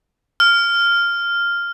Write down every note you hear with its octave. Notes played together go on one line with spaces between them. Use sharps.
F6